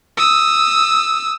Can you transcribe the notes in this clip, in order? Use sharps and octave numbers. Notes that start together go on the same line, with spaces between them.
D#6 E6